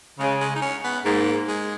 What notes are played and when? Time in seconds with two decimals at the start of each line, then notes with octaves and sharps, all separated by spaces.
0.19 C#3 G#3
0.40 G#3
0.56 D#4
0.62 C#4
0.84 B3
1.05 G#2 A#3
1.48 G#3